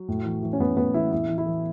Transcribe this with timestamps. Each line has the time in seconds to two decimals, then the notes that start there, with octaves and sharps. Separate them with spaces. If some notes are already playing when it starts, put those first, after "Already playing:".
Already playing: F#3
0.08 A2
0.25 E3
0.43 E3
0.53 C#4
0.60 A2 B3
0.77 A2 B3
0.94 E3 E4
1.12 A2 E4
1.29 E3
1.38 E4
1.46 E3